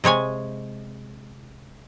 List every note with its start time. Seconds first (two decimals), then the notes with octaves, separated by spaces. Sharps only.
0.04 C3 G#3 C#5 G#5